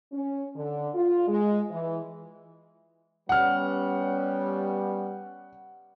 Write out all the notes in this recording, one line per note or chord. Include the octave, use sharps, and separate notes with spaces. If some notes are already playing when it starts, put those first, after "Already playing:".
C#4
D3
F4
G#3
E3
G3 B3 C#4 F#5 F6